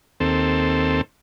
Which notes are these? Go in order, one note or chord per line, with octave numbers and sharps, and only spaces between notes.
D#2 C4 A4